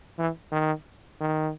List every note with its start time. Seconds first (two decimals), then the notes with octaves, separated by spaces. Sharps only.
0.19 E3
0.52 D#3
1.21 D#3